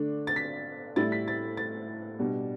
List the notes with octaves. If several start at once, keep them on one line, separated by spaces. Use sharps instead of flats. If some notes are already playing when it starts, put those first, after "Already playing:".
Already playing: D3 A3 D4
A6
B6
A2 G3 E4 A6
B6
A6
A6
B2 G3 D4